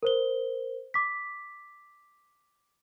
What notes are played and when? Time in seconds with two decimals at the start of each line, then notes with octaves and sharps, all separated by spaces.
0.03 A#4 C5 G7
0.94 D6 B6